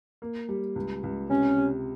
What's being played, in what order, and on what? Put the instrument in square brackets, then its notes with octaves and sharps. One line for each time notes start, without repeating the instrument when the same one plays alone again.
[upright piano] A#3
G3
C#2
C#2
[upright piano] C3 [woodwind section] C#4
[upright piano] C3